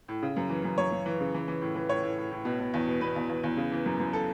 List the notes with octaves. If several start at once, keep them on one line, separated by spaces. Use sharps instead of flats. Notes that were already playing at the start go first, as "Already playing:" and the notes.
A2
C#3
F#2
E3
F#2
F#2 C#5
F#2
E3
C#3
E3
E3
A2
E3
A2 C#5
A2
A2
A2
B2
B2
E2
B2
B2 B4
E2
E2
E2
C#3
E3
F#2
F#2
A4